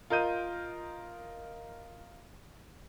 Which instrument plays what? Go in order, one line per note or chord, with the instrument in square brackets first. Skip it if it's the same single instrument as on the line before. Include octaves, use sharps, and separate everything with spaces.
[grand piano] F4 A#4 D#5 G6 D#7